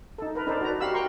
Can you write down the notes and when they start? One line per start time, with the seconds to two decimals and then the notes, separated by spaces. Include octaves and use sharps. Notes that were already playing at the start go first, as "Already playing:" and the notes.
0.18 D#4 A4
0.35 A#4 B4
0.47 D4 D#4 A4 A#4 C5 D5
0.61 F#4 B4 A#5
0.80 F#4 G4 F5 F#5 B5 E6
0.94 A#4 G5 A#5 C6 C#6